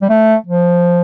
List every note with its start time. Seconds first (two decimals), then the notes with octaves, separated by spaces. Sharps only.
0.02 G3
0.09 A3
0.46 F3